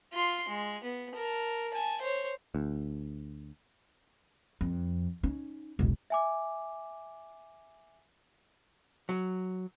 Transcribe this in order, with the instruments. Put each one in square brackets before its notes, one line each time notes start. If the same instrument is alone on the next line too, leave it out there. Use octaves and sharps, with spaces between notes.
[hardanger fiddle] F4 C6
G#3
B3
A#4 A5
G#5 A5
C5 C#5
[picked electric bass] D2
[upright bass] F2
C#4 D#4
E1 B1
[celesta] E5 G#5 D6
[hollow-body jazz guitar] F#3